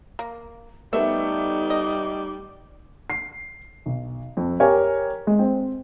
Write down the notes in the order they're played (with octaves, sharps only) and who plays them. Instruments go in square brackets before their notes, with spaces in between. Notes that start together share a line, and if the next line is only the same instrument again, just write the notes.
[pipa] A#3
[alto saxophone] G3 [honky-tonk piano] A3 B3 [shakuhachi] D#4 [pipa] E5
[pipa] D#5
[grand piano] C7
B1
F2
G4 A#4 C#5 G#5
G#3
C4 C5